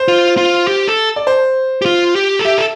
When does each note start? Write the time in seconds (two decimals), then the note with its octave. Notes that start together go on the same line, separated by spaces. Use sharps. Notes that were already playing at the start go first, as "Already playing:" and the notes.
Already playing: C5
0.08 F4
0.37 F4
0.67 G4
0.88 A4
1.16 D5
1.27 C5
1.82 G4
1.86 F4
2.16 G4
2.39 A4
2.45 G4 E5
2.58 A4